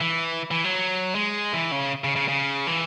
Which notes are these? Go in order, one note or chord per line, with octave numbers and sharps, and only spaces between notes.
E3
E3
F#3
G#3
E3
C#3
C#3
C#3
C#3
E3